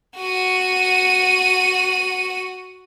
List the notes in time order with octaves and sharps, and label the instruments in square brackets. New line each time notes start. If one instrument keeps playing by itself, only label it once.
[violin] F#4 D#7